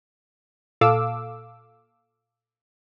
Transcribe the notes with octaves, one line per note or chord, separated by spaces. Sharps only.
A#2 A4 F5 D6 E6